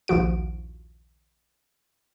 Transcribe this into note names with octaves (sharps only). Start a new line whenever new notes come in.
A#1 D#2 F3 F#4 D7